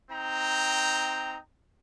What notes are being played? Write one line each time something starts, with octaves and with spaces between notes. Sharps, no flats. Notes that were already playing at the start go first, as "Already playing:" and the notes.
C4 D#4 G5 A#5